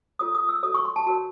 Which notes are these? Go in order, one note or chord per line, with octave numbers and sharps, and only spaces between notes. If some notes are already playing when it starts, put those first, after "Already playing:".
F4 A4 C#5 D#6
D#6
E6
F#4 A4 C#5 D#6
C#6
C6
A5
F#4 A#4 C#5 A5